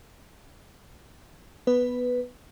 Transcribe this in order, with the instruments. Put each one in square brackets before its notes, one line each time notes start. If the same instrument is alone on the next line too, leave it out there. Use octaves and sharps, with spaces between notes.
[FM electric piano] B3 B4